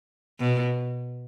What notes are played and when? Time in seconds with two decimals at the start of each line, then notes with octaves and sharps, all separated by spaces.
0.40 B2